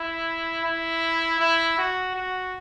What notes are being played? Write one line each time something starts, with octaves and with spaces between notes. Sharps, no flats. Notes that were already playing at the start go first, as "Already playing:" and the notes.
Already playing: E4
E4
E4
F#4
F#4